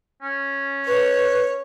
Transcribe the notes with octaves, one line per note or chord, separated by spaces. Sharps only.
C#4
B4 C#5